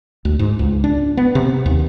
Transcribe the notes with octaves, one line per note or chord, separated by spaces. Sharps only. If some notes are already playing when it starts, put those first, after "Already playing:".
D2
G#2
C#2
D4
B3
C3
D#2